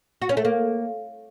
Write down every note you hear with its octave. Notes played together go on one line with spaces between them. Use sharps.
F#4
C#4
A3
A#3